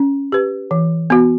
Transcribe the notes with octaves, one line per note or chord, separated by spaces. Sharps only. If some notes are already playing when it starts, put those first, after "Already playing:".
Already playing: C#4
G4 B4
E3
B3 F#4